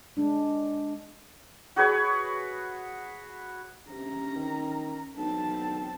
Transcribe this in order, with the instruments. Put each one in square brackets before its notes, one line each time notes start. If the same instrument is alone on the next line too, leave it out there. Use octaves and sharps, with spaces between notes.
[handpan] G#3 D4
[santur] F#4 G#4 B4 C#5
[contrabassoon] C3 [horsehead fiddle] C#4 A#5
[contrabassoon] D#3
[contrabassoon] B1 [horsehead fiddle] C4 A5